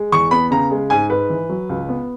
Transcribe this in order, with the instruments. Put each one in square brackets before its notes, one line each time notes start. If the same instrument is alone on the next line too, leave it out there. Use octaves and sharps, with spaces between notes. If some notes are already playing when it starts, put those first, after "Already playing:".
Already playing: [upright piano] G#3
E2 C#6
B3 B5
C#3 A#5
G#3
G#2 G#5
G#2 B4
E3
F#3
C#2
B3